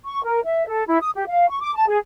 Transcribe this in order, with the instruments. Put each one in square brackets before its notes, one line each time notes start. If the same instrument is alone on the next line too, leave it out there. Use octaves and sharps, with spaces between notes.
[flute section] C#6
A#4
E5
A4
E4
D#6
G4
F5
C#6
D6
A5
G#4